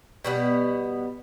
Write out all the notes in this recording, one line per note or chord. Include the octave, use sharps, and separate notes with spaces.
B2 G3 B3